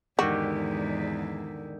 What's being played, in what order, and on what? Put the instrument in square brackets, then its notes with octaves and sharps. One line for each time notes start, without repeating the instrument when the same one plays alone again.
[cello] E2 G#2 [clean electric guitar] D3 D#3 G4 [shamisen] F#4